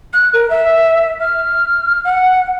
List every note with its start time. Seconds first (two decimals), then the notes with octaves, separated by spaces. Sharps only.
0.13 F#6
0.33 A#4
0.50 E5
1.20 F6
2.05 F#5